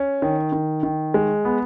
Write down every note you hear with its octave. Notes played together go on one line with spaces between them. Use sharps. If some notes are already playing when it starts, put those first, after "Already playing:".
Already playing: C#4
D#3
D#3
D#3
G#3
B3